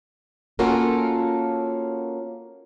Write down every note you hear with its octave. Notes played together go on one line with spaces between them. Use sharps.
A#3 C#4 F4 F#4 A4 A#4